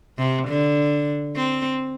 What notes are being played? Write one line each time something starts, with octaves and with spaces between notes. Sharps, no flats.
C3
D3
C4